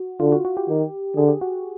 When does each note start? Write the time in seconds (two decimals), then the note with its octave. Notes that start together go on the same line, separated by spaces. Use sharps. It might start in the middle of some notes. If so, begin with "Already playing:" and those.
Already playing: F#4
0.20 D3 F4
0.32 F#4
0.45 F#4
0.57 G4
0.69 D#3
1.16 D3 G#4
1.28 G4
1.41 F#4